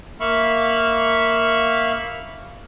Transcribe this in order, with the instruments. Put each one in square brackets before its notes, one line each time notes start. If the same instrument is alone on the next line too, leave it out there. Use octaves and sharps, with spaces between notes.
[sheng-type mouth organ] A#3 E5 F5 B5 C#6